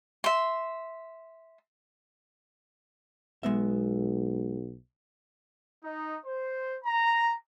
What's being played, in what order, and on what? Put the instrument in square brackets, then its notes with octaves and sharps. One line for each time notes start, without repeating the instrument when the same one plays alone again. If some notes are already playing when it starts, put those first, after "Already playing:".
[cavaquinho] E5 C6
[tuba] B1 [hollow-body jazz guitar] G#3 B3 E5
[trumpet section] D#4
C5
A#5